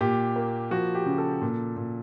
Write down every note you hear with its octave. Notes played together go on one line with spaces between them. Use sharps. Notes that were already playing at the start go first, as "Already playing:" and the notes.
A#2 G4
A#3
F3 F#4
G4
C#3
A4
A#2
A#2